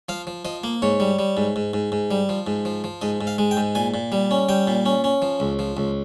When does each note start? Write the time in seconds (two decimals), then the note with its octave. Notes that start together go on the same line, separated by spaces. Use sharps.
0.09 F3 F5
0.27 F3
0.45 F3 D#5
0.64 A#3
0.82 G#2 C#5
1.00 G3
1.19 G3
1.37 G#2
1.56 G#2
1.74 G#2
1.92 G#2
2.11 G3
2.29 F3
2.47 G#2
2.65 F3
2.84 F3
3.02 G#2 D#5
3.21 G#2
3.27 F5
3.38 G#3
3.51 G5
3.57 G#2
3.75 A#2 G#5
3.94 A#2
4.12 G3
4.31 C#4
4.49 G3 G5
4.67 A#2
4.86 C#4
5.04 C#4
5.22 F3
5.40 C#2
5.59 F3
5.77 C#2